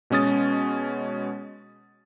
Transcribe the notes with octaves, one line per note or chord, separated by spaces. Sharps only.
B2 G#3 C#4 D#6 A6